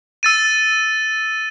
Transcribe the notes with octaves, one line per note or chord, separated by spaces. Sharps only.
E6 A6 D#7